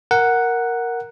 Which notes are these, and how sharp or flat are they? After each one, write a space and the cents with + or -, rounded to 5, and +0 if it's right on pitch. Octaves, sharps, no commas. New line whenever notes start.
A#4 +0 F#5 +0